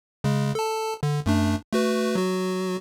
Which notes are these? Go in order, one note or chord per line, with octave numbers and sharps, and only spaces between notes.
C#3 G#3
A4 A5
D3
F#2 A3 D4
A3 F#4 B4
F#3 F#4